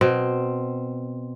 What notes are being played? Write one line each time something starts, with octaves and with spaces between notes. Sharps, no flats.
B2 C4